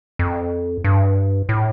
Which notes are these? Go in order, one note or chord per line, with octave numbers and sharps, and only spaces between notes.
F2
G2
A2